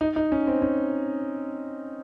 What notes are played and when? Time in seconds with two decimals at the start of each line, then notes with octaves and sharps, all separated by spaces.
0.01 D#4
0.16 D#4
0.32 C#4
0.47 C4
0.62 C#4